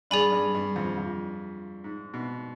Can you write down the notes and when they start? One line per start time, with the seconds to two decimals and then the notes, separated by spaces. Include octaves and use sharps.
0.11 G2 G#4 D5 G#5 B5
0.32 G2
0.54 G2
0.76 F2
0.98 F2
1.84 G#2
2.14 B2